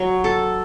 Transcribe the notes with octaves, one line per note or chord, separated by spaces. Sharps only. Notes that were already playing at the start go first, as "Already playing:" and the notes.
Already playing: F#3
A4